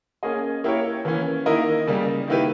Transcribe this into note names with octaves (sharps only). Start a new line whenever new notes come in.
A#3 C#4 G#4 D#5
A#3 E4 G4 A#4 C#5
E3 A#3 C#4
D#3 A#3 E4 A#4 D#5
C#3 G3 A#3
D#3 A#3 E4 G4 B4